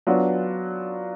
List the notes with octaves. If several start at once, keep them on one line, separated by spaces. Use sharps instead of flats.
F#3 B3 D4 F4